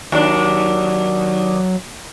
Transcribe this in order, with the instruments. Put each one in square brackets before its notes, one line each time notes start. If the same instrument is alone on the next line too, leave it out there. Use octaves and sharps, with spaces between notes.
[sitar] D#2 D4 [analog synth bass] F#3